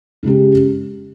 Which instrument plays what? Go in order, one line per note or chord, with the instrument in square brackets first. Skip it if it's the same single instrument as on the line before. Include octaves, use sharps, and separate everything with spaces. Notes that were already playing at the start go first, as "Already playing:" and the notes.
[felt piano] C#3 G#3 C#4 G4